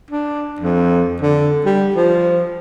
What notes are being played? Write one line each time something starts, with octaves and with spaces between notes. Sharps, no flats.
D4
F2
D3
G3
F3